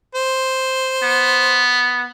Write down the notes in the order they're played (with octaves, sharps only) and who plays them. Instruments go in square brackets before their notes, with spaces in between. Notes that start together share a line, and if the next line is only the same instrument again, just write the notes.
[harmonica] C5
[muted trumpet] B3